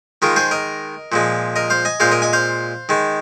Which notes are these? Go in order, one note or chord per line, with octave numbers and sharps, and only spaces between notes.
D#3 G#3 F4 A#4
G#4 C5
A#4 D#5
A#2 F3 G#3
A#4 D#5
C5 F5
D#5 G#5
A#2 G#3 C5 F5
A#4 D#5
D#5 G#5
C5 F5
D#3 G#3